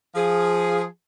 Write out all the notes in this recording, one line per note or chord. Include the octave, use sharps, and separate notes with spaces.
F3 G#4